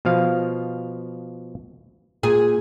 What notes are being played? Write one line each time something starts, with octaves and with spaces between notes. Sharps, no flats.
B2 F3 F5
A#2 G#4